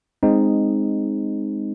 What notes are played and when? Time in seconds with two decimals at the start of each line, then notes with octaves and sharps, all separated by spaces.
0.23 G#3 C4 D#4